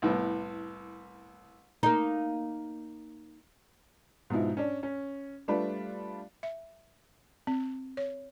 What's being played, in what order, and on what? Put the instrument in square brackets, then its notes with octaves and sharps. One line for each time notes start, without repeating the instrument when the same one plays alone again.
[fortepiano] C2 A2 B3
[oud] A#3 D#4
[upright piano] G#2 B2 F3 D#4 E4
C#4 D4
C#4
G3 A3 D4 F4 B4
[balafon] E5
C4
C#5